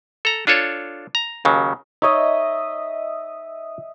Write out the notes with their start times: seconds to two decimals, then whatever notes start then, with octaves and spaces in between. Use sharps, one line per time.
0.25 A4 A#5
0.47 D4 F4 A4 C#5
1.15 A#5
1.45 D#2 C#3 F#3
2.02 D#4 C#5 D#5 E5